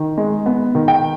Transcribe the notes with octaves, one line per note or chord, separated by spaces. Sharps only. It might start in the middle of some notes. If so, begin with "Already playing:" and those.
Already playing: D#3
G#3
B3
D#3
G5